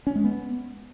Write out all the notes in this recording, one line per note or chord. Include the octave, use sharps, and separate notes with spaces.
C#4
G#3
B3